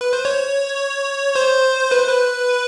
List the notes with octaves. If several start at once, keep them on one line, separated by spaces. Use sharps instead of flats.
B4
C5
C#5
C5
B4
C5
B4